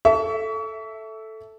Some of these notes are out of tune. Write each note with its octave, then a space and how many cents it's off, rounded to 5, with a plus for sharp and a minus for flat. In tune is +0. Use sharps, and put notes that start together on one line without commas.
A4 +0 E5 -5 C#6 +35